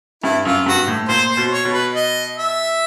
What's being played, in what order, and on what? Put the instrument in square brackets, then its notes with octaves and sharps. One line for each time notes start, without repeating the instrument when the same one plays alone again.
[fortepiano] G2 [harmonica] E4
[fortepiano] F#2 [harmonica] F4
[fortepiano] G2 [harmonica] F#4
[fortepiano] A2
[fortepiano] A#2 [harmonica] C5
[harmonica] C5
[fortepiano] B2
[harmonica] C#5
[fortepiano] B2
[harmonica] B4
D#5
E5